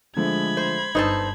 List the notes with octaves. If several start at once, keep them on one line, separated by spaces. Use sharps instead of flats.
D3 F3 G#3 A3 B5 G#6
C5
G1 D#4 B4 C5 A5 D#6 E6